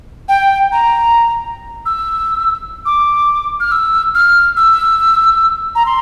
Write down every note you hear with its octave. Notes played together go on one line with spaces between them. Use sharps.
G5
A#5
E6
D6
F6
E6
F6
E6
A#5
C6